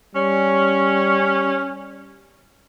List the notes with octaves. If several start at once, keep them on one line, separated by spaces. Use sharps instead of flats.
G3 C#4